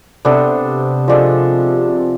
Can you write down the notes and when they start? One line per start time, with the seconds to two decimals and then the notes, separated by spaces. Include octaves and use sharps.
0.25 C3 B3 D4 A4 C5
1.08 F3 G#3 D4 A4